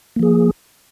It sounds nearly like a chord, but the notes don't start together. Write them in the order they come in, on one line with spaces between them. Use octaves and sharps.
A#3 F3 G#4